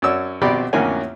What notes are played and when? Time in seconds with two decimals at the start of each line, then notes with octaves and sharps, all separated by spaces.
0.02 F#2 F#4 C#5 D5 E6
0.41 A#1 B2 C4 G4 D5 B5
0.73 A1 F2 D3 A#3 C#4 G#5